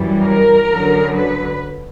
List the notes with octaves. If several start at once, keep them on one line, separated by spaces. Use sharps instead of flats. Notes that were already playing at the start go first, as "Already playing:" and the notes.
Already playing: F#2 E3 G3
A#4
F#2 D3 F#3
B4